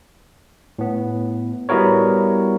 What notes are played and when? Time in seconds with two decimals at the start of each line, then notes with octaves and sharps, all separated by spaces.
0.79 A2 B3
1.69 G3 B3 E4 F#4 A#4 C#5